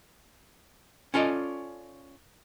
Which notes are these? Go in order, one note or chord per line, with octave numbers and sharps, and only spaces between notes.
C#4 F4 A4 D5 D#5